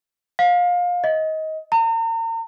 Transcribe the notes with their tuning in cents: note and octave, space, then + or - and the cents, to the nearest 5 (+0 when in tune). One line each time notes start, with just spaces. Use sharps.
F5 +25
D#5 +20
A#5 -40